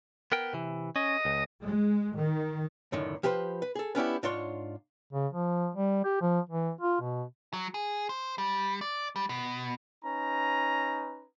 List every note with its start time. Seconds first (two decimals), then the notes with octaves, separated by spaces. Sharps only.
0.32 B3 A#4 G5
0.53 C3 E3
0.96 C#4 D#5
1.25 C#2
1.63 G#3
2.17 D#3
2.92 C#2 F#2 A2 D3 D#3
3.23 F3 G4 G#4 B4 C5
3.62 B4
3.75 G#4 A4
3.95 B3 C#4 D4 E4 G4
4.23 G#2 D4 F4 C#5 C6
5.13 C#3
5.33 F3
5.76 G3
6.04 G4
6.21 F3
6.50 E3
6.81 F4
7.01 B2
7.53 F#3
7.74 G#4
8.09 C5
8.38 G3
8.81 D5
9.16 G3
9.29 B2
10.05 C#4 D#4 B4 A#5